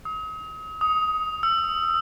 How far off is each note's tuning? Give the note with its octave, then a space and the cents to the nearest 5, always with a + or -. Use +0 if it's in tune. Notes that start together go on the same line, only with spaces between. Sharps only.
D#6 +40
D#6 +20
E6 +30